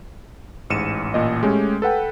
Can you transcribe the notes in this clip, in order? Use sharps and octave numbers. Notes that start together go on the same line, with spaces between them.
A1 G#2 C#7 D#7 E7
A1 A#2 D#5
G#3 A3 C#4 G4
A4 B4 F#5 G5